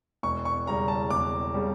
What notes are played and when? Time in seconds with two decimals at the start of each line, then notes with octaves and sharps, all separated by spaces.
0.23 E1 C#6
0.45 C#6
0.67 E2 C#3 G3 A#5
0.88 A5
1.10 E1 D6
1.54 C#3 G3